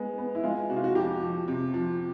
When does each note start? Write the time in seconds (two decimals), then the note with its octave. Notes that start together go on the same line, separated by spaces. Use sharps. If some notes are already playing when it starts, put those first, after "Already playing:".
Already playing: G#3 B3
0.18 B3
0.35 E4
0.43 G#3 F4
0.70 C3 F#4
0.77 F4
0.84 F#4
0.95 F2 G4
1.21 F3
1.48 C3
1.74 F3